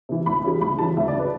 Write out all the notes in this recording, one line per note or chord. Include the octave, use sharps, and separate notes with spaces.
C3 E3
D2 B5
C#3 E3 G3
D2 B5
C#3 E3 G3 A5
D2 E5
D5
C#3 F#3 B4